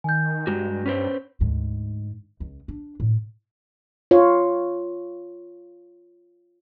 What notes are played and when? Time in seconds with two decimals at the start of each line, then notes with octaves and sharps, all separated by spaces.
0.04 D#3 G#5 G6
0.47 G2 G#3 F#4
0.86 C#4 B4 C5
1.40 D2 G#2
2.40 C#2
2.68 D4
3.00 A2
4.11 F4 C#5